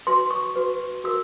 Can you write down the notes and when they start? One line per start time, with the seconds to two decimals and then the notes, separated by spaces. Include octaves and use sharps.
0.07 F#4 B4 C6
0.31 C#6
0.56 F#4 B4
1.04 F#4 A#4 E6